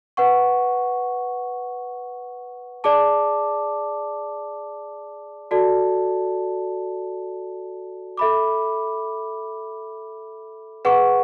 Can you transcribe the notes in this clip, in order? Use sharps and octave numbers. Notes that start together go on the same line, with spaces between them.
B4 F#5 C#6
G#4 D5 A5 D6
F#4 A4 D5 A5
A4 E5 B5 D6
G#4 B4 F#5 C#6